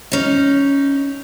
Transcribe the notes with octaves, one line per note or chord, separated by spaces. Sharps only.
C#4 D#4